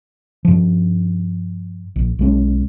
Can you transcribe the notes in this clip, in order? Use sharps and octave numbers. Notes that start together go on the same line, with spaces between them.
G2 F3
A#1
B1 G#3 C#4